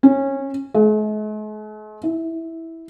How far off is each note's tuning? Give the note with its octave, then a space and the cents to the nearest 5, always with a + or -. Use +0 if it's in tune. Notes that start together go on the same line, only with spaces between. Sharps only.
C#4 -20
G#3 +45
E4 -10